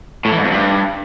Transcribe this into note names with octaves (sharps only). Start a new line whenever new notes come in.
A2
E3
G#2
F2
G2